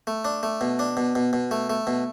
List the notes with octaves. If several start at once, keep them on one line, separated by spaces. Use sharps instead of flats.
A3
D4
A3
B2
D4
B2
B2
B2
A3
A3
B2